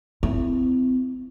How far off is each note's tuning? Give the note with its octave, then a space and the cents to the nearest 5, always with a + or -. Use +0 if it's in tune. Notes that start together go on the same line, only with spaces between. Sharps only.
C4 -35 E4 +20